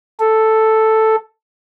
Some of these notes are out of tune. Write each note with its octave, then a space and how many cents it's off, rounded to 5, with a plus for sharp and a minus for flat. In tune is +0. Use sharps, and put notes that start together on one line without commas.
A4 +0